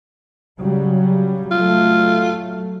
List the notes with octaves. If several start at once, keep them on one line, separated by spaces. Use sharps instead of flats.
C#3 F#3 G3
F#3 A3 F4